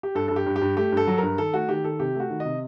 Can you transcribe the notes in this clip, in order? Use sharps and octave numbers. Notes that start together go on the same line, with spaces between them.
G4
G2 A4
G2 A4
G4
G2
G4
G2
A3 G4
G2 A4
F#3
G2 A#4
D#3 A4
A3 F#4
D#3 G4
D#3 A4
C3 G4
A3 F#4
D#3
D#5
C3